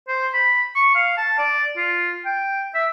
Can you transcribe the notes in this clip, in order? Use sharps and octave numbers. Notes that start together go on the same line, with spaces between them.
C5
B5
C#6
F5
A5
D5
F4
G5
E5